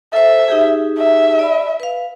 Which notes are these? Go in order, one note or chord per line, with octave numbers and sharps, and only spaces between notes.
A4 C5 E5
D#4 G4 G#4
E5
D5 B5
B4 F5